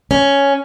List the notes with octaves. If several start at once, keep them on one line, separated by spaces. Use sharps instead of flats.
C#4